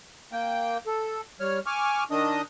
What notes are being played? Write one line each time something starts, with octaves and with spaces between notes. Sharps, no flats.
A#3 G5
A4
G3 C#5 F6
G#5 C#6 D6 F6
D#3 D4 D#5 D#6